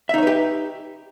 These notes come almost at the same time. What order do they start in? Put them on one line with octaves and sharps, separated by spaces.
E5 D#4 C#5 B4 G4